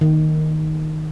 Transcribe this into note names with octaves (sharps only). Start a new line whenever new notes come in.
D#3